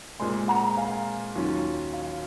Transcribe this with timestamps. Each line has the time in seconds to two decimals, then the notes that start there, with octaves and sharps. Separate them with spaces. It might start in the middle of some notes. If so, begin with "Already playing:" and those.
0.19 A#2 G#3 C4 G#5 C6
0.48 F#5 A#5
0.77 F5 G#5
1.35 D#2 D#3 F#3 C#4 F4
1.93 C#5 F5